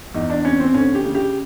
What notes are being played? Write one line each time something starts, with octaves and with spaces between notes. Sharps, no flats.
E2 D#4
D4
C3 C#4
C4
D2 C#4
G4
C#3
G4